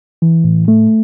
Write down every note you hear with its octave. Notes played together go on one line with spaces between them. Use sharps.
E3
A2
A3